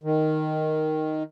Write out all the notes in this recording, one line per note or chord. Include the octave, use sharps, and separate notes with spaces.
D#3